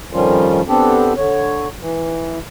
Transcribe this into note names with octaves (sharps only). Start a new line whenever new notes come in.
F2 D#3 F3 G3 C#4 F4
B3 C4 D4 G4 A4
D3 C#5
E3